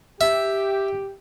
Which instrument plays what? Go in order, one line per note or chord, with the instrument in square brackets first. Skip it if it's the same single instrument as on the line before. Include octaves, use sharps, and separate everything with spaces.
[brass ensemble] G4 [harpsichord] E5